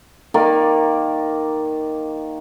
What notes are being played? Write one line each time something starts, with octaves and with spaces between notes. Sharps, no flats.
D#3 A#3 A#4 D5